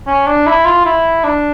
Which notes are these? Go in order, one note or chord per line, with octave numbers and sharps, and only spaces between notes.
C#4
D4
E4
F4
E4
D4